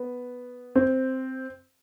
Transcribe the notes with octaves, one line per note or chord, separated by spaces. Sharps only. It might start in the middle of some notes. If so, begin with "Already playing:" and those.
Already playing: B3
C4